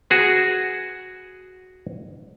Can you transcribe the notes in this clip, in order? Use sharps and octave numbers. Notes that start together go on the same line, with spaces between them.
F#4 G#4 B4